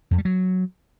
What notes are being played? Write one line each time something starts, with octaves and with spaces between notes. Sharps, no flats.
F2
G3
F#3